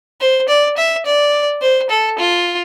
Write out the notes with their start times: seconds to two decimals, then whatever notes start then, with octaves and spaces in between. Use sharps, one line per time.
0.21 C5
0.49 D5
0.77 E5
1.06 D5
1.62 C5
1.90 A4
2.18 F4